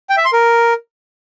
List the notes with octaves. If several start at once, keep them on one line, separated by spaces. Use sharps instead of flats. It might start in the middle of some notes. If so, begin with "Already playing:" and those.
G5
E5
C6
A#4